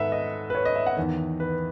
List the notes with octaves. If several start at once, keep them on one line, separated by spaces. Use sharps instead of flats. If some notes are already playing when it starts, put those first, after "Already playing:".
Already playing: G#2 D#3 A4 B4 E5 F#5
D#5
B4
C#5
D#5
E5
F#5
E2 D#3
B4